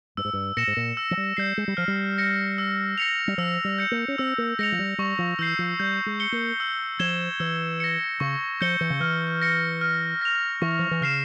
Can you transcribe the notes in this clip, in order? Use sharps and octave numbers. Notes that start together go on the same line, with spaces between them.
G2 E6
G#2
G2
A#2 A#6 C#7 E7
G#2
A#2
E6
F3
G3
G3 G6 C7
G#3
G3
F3 F6
G3
A#6 C#7
E6
A#6 C#7 F7
G3
F3 E6
G3
G6 C#7
A#3
C#4
C4 E6
A#3
G#3 A#6 C#7 F7
F3
G3
G3 C#6
F3
E3 E6 G6 C7
F3
G3 G6
G#3
C#7 G7
A#3
E6
F3 G#6 E7 G7
E3 E6
A#6 C#7
C#3 C#6
F3 G6 C#7 G7
E3
C#3
E3 F6
A#6 C#7
F6
A#6 F7
E3 C#6
F3
E3
C#3 F6 C7 E7